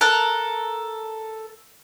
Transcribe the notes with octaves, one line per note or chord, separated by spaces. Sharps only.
A4 A#4 F#6